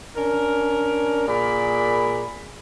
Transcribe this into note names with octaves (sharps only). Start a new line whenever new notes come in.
C#4 D4 A#4
A#2 G#4 A#4 D5 B5